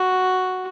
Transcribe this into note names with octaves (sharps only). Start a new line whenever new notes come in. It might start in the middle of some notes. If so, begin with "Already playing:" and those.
Already playing: F#4